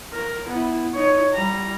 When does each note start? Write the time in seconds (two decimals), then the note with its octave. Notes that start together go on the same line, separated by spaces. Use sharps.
0.13 A#4
0.49 B3 E4
0.94 D#4 C#5
1.33 G3 A#5